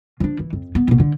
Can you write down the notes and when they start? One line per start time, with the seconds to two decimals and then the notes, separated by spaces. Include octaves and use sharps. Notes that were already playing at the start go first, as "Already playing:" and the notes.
0.20 F3 D4
0.39 E3
0.53 F2
0.75 B3
0.88 A#1 B2
1.00 D3